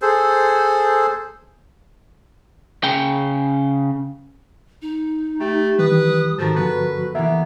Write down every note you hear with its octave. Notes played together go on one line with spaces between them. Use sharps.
G#4 A4 C5
C#3 G5
D#4
A3 G4
D#3 E3 G3 B4 D#6
G#2 D#3 F3 F#4 A4 A#4
G2 D3 F3 B3 B4
E3 A#3 B3 E5